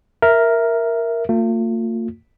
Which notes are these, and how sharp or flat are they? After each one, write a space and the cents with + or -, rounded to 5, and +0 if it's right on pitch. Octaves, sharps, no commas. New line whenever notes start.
A#4 +0 E5 +0
A#3 -45 F4 +35